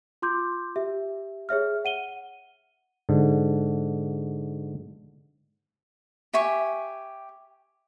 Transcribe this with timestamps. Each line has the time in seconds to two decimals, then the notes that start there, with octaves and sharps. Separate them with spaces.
0.22 F4 C6 D6 G6
0.76 G4 E5
1.49 G#4 C#5 E5 F6
1.85 F#5 D#7 G7
3.09 G#2 D3
6.33 G4 E5 G#5 C#6